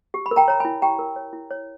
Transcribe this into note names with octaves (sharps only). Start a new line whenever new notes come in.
G4
B5
A#4
G5 A#5
C#5 A#5
G#5 B5
E4
G4 G5 A#5
A#4
C#5
E4
C#5